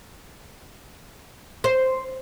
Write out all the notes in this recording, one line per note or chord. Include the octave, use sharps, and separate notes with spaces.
C5